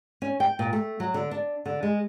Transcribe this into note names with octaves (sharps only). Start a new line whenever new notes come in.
C#4
G5
A#2
A3
F#3
D3
D4
D3
G#3